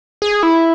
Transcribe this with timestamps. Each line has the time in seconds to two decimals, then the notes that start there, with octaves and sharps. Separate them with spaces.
0.22 G#4
0.43 E4